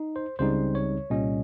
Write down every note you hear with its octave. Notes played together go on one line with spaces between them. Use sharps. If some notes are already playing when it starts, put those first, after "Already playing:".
Already playing: D#4
C5
C#2 C#3 G3 C4 D#4 C5
C#5
C2 A#2 G3 C#4 D#5